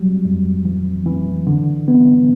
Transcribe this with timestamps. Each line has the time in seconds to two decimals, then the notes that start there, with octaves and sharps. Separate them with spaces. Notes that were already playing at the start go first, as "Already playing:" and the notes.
Already playing: F#3 G3
0.25 F2
0.65 E3
1.06 E3
1.47 D3
1.88 B3